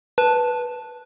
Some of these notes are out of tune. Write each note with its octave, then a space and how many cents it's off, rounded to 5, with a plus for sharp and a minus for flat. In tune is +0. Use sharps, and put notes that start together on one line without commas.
B4 -10 A5 +0